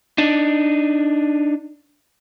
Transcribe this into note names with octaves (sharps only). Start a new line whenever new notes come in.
D4 D#4